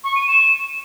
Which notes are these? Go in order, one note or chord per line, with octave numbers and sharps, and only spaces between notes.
C#6
D#7
E7